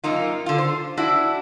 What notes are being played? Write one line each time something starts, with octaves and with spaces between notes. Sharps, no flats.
F#2 A#3 D#4 F4
D3 F4
C5
D4 E4 F#4